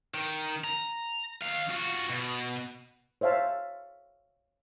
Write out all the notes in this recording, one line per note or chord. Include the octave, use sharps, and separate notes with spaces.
D#3
A#5
D#3 F5
F4 F#4
B2
C5 C#5 E5 F5 A5